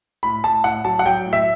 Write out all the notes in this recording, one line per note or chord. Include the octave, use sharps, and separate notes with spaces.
A2 B5
A2 A5
A2 F#5
F#3 A5
F#5
F#3 G5
A2
E5